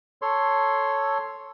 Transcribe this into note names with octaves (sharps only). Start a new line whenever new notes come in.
A4 C#5 C6